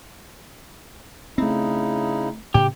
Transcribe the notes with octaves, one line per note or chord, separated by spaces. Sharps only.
C#3 A3 C4 D#4 E4
A2 C#3 G4